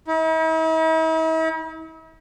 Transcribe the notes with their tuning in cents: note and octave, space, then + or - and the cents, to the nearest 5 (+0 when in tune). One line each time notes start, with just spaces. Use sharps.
E4 -45